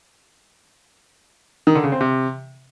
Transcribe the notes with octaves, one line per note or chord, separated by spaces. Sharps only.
D#3
D3
C#3
C4
C3